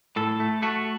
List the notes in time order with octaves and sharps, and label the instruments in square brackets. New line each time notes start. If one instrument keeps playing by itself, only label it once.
[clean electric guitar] A2 A4
A3
A3 F#4